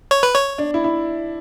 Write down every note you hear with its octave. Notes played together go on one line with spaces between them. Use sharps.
C#5
B4
C#5
D4
E4
E4